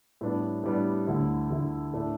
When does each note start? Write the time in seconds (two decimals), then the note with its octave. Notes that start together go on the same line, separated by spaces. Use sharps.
0.21 A2 G3 B3 D4
0.63 A2 G3 B3 D4
1.07 D2 D3 A3 E4
1.50 D2 D3 A3 E4
1.93 A2 A3 D4